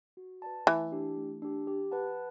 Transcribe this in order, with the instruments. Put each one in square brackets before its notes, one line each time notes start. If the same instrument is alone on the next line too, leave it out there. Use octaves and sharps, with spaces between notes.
[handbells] F#4
B4 D5 A5
[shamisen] E3 [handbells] A3
[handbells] D4 G4
A3
D4 G4
G4
B4 F#5 A5